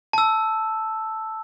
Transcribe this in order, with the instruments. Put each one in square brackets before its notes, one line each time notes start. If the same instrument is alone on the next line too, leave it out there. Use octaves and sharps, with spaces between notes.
[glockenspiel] A5 E6